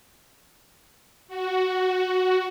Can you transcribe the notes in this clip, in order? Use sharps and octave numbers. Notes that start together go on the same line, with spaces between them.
F#4